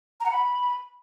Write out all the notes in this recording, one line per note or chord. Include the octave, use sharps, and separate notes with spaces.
A#5
F#5
B5